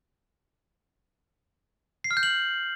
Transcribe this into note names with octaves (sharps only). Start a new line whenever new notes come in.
C7
F6
G6
F#7